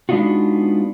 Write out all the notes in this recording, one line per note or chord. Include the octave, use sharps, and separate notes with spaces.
G#3 B3 D4 D#4 F4 F#4